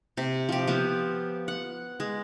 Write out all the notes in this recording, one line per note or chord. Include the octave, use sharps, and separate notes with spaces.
C3
F3 G4
F3 B3
F#5
G#3